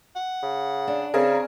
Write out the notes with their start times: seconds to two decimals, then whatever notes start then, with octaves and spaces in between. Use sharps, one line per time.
0.16 F#5
0.43 C#3
0.88 D4
1.14 C#3 C4 G#4 A#4